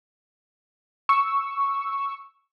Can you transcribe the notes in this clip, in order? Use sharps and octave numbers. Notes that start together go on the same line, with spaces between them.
C#6 E6